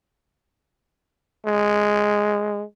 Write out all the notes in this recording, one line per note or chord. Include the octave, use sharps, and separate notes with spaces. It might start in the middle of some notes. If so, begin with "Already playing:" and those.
G#3